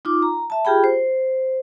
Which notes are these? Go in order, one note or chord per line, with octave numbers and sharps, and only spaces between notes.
D#4 F4 D6
A#5
E5 A5
F4 G4 G#4 G5 B5
C5